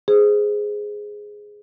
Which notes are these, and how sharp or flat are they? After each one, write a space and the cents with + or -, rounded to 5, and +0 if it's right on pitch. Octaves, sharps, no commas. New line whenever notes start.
G#4 +0 C5 -10